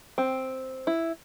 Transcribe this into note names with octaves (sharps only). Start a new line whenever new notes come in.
C4
E4